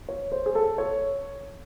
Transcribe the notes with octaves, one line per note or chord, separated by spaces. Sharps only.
C#5
C5
G#4
A4
C#5